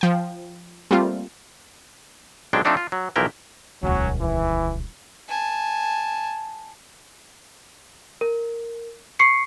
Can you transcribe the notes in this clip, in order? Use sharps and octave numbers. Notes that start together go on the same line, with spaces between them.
F3 G5
G3 A3 A#3 C4 F4
B1 A#2 F#3 G#3 D4 G5
F3 A3 C4 D4 D#4
F4
F#3
B1 E3 F3 E4 A#4 G5
D#1 C#2 F#3 C#4 F#4
E3
G#5 A5
A#4
C#6 C7 C#7